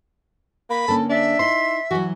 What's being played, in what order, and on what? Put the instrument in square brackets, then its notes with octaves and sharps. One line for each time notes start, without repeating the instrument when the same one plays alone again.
[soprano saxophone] A#3 [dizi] B5
[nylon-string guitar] D3 A#3 C#4 [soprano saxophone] A4
[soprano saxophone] D4 [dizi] E5
[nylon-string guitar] D#4 E4 [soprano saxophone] C6
[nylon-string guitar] E3 F#3 [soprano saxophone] F#4